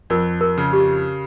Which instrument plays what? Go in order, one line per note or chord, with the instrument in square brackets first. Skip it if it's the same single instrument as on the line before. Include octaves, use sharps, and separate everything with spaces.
[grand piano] F2 [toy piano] A#4
[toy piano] A#4
[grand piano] C#3
[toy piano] G4